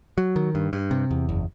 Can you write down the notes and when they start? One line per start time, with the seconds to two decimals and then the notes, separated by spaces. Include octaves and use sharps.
0.18 F#3
0.36 D#3
0.55 G2
0.73 G2
0.91 C3
1.11 E2
1.29 F#1